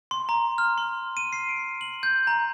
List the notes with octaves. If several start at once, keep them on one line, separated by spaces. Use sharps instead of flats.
C6
A#5
F6
C6
D#7
C7
D7
F#7
G6
A#5